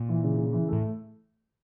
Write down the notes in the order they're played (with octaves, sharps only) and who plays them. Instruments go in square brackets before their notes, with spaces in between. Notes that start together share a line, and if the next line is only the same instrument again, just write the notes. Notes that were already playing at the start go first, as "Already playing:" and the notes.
Already playing: [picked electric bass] A#2
[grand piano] E3
C#3
C#3
E3
[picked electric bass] A2 [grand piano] A3